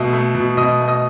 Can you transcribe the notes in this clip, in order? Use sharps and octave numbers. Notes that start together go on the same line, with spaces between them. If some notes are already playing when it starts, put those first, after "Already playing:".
Already playing: B2 A3 D#5
A3
B2
B2 D#5 D#6
A3
D#5 D#6